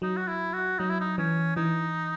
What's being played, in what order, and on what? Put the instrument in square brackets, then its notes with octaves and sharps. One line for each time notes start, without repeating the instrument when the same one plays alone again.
[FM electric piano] F#3 [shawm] D#4
[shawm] F#4
E4
F#4
[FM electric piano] F#3 [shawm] D#4
[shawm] E4
D#4
[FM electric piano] E3 [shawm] C#4
[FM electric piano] E3 [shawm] D#4